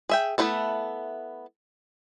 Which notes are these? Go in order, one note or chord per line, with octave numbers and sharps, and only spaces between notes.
G#4 E5 G5
A3 B3 C4 E4 A4